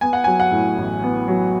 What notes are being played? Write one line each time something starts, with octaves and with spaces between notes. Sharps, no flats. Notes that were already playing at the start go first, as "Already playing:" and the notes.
B3 G#5
F#5
F#3 G#5
F#5
A2
A1
B3
F#3